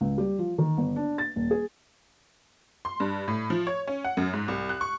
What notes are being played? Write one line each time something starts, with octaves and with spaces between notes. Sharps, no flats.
C#2
G3
F3
D#3
G1
D4
A6
D#1
G#4
C6
G2
A2
F3
C#5
C#4
F#5
F#2
G#2
C2
F#6
C#6